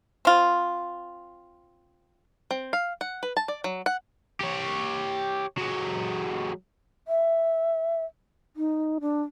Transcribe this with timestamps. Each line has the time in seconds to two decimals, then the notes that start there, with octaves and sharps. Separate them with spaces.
0.25 C4 F4
2.51 C4
2.73 F5
3.01 F#5
3.23 B4
3.37 A5
3.48 D5
3.64 F#3
3.86 F#5
4.41 G4 C#5
5.58 F#3 G#3
7.08 E5
8.56 D#4
9.01 D4